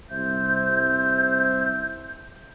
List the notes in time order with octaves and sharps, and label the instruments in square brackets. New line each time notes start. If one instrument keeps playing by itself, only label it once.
[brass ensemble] C2 C5 E5 [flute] G6